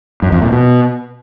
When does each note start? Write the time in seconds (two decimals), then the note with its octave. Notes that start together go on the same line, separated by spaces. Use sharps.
0.22 F#2
0.32 F2
0.42 A#2
0.52 B2